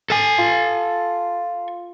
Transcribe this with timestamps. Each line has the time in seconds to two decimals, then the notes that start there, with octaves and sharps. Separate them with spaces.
0.10 A4 G#5
0.39 F4